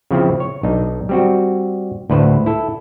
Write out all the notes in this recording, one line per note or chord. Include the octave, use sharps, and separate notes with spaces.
C#3 F3 C4 E4
C#5
B1 D4 D#4
G3 C4 F#4
D2 A2 B4 C5
E4 A4